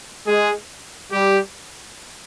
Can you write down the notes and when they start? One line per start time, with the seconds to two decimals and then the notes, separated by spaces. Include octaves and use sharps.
0.26 G#3 G#4
1.11 G3 G4